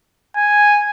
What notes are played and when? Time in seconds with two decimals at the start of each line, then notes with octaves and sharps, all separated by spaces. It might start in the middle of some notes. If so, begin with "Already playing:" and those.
0.36 G#5